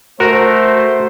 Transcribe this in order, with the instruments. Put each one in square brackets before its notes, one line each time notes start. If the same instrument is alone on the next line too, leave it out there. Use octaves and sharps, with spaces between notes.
[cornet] A3 [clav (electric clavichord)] F#4 A#4 [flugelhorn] C5